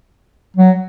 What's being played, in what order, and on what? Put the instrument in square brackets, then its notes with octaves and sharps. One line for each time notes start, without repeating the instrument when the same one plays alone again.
[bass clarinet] F#3